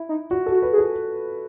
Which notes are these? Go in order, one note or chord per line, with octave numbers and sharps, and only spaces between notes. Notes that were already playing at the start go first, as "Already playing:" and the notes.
Already playing: E4
D#4
F#4
A4
F#4
B4
G#4
A4